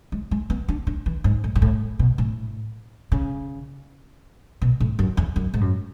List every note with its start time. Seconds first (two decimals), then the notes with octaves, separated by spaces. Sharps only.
0.12 G#3
0.31 G#3
0.50 B3
0.68 D4
0.87 D4
1.06 E3
1.24 G#2
1.44 A2
1.55 G#2
1.62 A2
1.99 B2
2.18 A2
3.12 C#3
4.62 B2
4.80 A2
4.99 F#2
5.17 E2
5.36 F#2
5.54 G#2
5.61 F#2